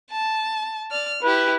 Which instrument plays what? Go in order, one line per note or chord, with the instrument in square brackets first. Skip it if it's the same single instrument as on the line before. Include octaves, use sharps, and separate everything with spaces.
[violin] A5
D5 F6
[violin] E4 G4 [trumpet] B4